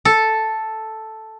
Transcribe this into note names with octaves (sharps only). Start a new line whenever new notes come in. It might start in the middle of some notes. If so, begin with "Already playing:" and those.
A4